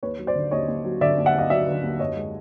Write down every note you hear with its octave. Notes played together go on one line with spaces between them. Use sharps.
D#2 B4 C#5
F#3
C5 D5
D3
D#2 C#5 D#5
D#2
F#3
D3 D5 E5
D#2
E5 F#5
D#2 D#5 F5
F#3 D5 E5
D3
D#2
F#2 C#5 D#5
G#3